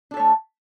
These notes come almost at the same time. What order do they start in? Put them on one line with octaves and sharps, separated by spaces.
D4 A4 C#5 A3